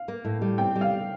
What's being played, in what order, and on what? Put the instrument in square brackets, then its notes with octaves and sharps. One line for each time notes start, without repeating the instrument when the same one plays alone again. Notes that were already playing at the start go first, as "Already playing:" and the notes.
Already playing: [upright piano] F5
[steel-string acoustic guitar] A#3
A2
G3
[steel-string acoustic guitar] C4 [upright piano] G5
[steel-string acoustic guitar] G3
[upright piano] F5